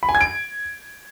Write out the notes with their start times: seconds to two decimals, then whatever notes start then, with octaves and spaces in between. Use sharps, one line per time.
0.03 B5
0.09 G#5
0.15 G#6
0.21 D7